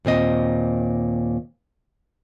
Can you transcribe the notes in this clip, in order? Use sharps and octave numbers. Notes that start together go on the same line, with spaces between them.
D#2 A#2 C4 D#5